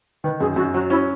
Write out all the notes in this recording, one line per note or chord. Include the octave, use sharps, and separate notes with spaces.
D#3 B4
F#2 G#4
F#2 F#4
F#3 F#4
C#4 E4